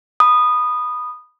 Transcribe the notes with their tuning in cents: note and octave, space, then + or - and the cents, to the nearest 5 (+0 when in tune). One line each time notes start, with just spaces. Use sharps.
B5 +0 D#6 -15